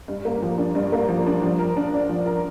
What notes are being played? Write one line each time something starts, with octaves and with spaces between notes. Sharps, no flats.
G2
A#3
F3
D4
G2
A#3
F3
D4
F3
A#4
D4
D5
F3
A#4